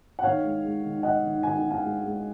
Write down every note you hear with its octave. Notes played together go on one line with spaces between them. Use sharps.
F#5
D#3 C#5 F5
G#3
G#3
D#3
D#3 D#5 F#5
D#3
D#3 G#5
D#3
F5 G#5
G#3
G#3